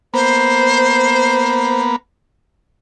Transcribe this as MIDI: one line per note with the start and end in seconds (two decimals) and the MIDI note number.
0.14 1.96 58
0.14 1.96 59
0.14 1.82 72